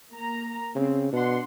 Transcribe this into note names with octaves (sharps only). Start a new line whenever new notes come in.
A#3 A#5
C#3 C4
B2 D4 F#5 C6